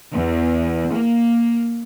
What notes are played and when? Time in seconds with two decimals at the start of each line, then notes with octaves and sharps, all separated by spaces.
0.13 E2
0.92 A#3